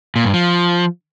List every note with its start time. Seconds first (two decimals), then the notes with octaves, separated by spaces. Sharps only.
0.16 A#2
0.25 G2
0.34 F3